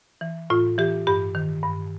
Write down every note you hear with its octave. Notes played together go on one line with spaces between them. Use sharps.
E3
A2 F4
E3 G4
G2 G4
D#3
G2